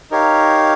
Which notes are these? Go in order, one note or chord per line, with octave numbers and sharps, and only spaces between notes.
D#4 G4 A#4 C#5 F5